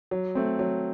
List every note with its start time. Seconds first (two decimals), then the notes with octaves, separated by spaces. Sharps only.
0.11 F#3
0.35 A3 C4
0.59 F#3